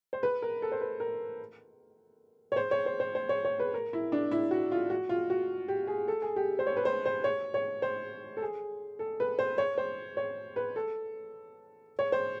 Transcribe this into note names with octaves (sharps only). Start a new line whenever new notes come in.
C5
B4
A#4
A4
C5
B4
A#4
C#5
C5
C#5
C5
C5
C5
C#5
C#5
B4
A#4
E4
D4
E4
F#4
F4
F#4
F4
F#4
G4
G#4
A4
G#4
G4
C5
C#5
B4
C5
C5
C#5
C#5
C5
A4
G#4
A4
B4
C5
C#5
C5
C#5
B4
A4
C#5
C5